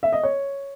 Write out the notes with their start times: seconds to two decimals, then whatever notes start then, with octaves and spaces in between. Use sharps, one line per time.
0.03 E5
0.12 D#5
0.23 C#5